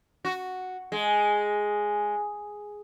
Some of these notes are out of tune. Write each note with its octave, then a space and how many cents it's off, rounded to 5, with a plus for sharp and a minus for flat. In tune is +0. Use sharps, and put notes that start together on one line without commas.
F#4 +0
G#3 +0